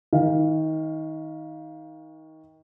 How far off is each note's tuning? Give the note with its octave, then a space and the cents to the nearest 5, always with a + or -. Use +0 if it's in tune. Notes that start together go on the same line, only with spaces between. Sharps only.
D#3 +25 F5 +0